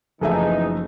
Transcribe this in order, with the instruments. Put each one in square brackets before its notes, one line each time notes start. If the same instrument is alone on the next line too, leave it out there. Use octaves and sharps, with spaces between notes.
[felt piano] F#1 A3 E5 [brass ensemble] E3 D#4 [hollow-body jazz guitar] F3 G#4 A4